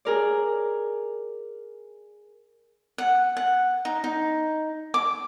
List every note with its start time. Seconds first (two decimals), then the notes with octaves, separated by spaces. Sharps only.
0.05 G#4 A#4 D5
2.98 F#5
3.37 F#5
3.85 D#4
4.04 D#4
4.94 D6